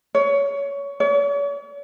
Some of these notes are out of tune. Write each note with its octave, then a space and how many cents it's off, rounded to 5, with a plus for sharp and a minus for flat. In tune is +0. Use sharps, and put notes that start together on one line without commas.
C#5 +20
C#5 +45